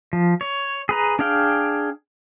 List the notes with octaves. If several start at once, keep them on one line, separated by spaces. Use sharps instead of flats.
F3
C#5
G#4 B4 A#5
D4 G#4 F5 G5